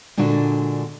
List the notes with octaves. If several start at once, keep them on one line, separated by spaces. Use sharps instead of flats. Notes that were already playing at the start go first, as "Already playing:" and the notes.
A#2 D3 G#3 D4 F#4